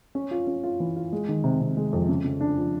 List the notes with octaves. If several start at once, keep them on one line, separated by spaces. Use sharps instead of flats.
C#4
F4
C#4
F4
E3
F4
G#3
D#3
C3
C3
G#3
F2
C#3
C#3
D4
F3